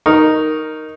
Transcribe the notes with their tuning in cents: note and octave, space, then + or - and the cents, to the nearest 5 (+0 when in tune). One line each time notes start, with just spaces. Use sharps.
D#4 +0 A#4 +0 C#6 -10